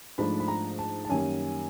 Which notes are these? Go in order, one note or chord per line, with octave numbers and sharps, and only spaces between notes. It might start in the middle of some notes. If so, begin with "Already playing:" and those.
G#2 F3 A3 D4 B5
B5
A#5
A5
A5
F#2 D#3 G3 A#3 G#5